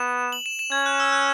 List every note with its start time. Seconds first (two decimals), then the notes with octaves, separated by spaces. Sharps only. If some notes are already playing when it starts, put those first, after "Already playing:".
Already playing: B3 E7
0.32 F#7
0.46 E7
0.59 E7
0.72 C#4 G#6
0.86 F#6
1.00 E6
1.12 F#6